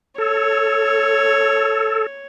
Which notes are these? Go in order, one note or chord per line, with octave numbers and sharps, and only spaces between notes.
A4 C#5